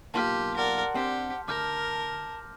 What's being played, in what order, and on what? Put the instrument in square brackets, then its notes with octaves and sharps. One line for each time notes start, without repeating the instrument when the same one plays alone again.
[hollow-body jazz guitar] B1 A#3 F4 [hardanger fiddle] G4 [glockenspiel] A5 C6 F6
[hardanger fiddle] A#4 D5 [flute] F#5
[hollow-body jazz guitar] C4 D4 [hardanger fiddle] G4
[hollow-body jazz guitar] D2 [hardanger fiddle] A#4 [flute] A5 [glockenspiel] D6 F6 G6